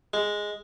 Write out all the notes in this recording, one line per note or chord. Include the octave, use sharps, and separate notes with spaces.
G#3